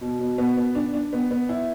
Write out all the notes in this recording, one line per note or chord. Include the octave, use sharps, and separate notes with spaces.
B2
B2
B3
B3
D4
D4
B3
B3
E4